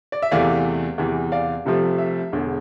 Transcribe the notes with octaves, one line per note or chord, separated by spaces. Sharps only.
D5
E5
E2 C3 E3 A3 D5 F5
E2 C3 E3
D5 F5
C2 C3 F3 A3
E5
E1 E2 D3